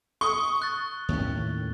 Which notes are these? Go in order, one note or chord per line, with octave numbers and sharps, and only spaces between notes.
C#6 D#6 G7
F#6 A6
D#2 A2 C#4